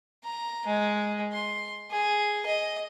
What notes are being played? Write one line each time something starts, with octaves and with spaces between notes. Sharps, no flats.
A#5
G#3
C6
G#4
D#5